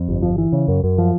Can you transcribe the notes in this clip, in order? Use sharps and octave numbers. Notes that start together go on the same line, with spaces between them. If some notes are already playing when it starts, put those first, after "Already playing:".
Already playing: F2
G1
F3
E3
C#3
F#2
F#2
F3